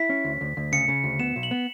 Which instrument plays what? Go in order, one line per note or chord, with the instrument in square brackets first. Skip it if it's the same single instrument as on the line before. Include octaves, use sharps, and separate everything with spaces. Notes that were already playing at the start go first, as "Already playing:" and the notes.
Already playing: [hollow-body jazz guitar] E4 [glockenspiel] B6
[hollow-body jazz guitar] C#4
D2
D2
D2
[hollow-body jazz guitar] C#3 [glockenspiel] C#7
[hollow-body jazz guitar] C#3
D2
[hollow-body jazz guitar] B3 [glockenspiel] E7
[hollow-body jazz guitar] B1
[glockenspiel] F#7
[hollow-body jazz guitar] B3